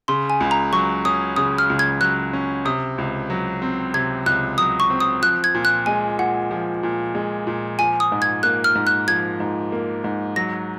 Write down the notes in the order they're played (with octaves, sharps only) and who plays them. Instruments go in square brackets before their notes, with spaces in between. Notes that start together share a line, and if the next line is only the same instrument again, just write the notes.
[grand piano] C#3 [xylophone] C6
[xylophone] G#5
[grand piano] C#2
[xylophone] A#5
[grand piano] F#3 [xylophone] C#6
[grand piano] C#4 [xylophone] D#6
[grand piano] C#3 [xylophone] D#6
[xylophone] F6
[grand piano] C#2
[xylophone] G#6
[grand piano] F#3 [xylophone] F#6
[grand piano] C#4
[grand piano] C3 [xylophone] D#6
[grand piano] C#2
F#3
C4
[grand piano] C3 [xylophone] G#6
[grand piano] C#2 [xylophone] F#6
[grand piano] F#3 [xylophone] D#6
[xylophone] C#6
[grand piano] C4
[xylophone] D#6
[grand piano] F3 [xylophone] F#6
[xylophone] G#6
[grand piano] A#2
[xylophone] F#6
[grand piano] G#3 [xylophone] G#5
[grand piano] A#2 [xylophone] F#5
[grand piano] F3
A#2
G#3
A#2
[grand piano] F3 [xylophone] G#5
[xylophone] D#6
[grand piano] G#2
[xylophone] G#6
[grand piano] A#3 [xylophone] F#6
[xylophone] F6
[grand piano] G#2
[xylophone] F#6
[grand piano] F3 [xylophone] G#6
[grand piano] G#2
A#3
G#2
[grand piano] F#3 [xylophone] A#6